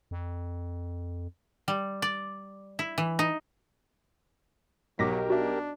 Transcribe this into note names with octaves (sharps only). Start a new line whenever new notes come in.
F2
G3
D5
E4
E3
D#4
B1 F#3 G4 A#4 D6 A#6 B6
D4 F#4 E5